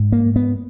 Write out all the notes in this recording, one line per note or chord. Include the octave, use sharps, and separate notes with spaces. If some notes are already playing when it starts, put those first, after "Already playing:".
Already playing: G#2
A#3
B3